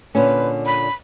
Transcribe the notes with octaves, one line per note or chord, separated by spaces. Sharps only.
A#2 D3 C#4 B4
B5